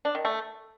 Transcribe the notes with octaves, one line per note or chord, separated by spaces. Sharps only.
D4
D#3
A3